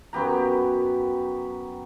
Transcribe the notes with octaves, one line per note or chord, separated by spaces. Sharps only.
F#2 B3 G4 A#5